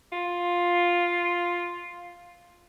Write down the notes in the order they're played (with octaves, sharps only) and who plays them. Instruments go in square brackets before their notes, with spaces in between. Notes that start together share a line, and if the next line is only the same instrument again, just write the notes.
[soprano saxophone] F4